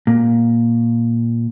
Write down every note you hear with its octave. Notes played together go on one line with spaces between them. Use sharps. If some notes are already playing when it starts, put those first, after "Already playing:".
A#2